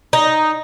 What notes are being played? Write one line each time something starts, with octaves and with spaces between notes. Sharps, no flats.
D#4